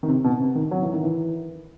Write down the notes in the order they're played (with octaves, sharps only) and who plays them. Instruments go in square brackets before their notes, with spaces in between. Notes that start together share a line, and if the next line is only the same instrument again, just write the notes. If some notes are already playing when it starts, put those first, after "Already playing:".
[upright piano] D#3
C3
B2
C3
D#3
F#3
E3
D#3
E3